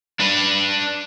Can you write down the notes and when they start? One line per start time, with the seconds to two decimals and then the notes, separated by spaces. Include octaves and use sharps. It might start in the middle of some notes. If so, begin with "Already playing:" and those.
0.20 D4 B4